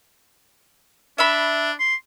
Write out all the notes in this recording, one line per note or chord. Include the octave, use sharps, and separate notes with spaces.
D4 E5 B5
C6